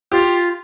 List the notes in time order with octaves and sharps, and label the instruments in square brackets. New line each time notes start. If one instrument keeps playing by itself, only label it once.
[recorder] F4 [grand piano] G4